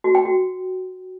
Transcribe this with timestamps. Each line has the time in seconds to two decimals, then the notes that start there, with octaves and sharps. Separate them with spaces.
0.04 F#4
0.15 G5
0.25 F#4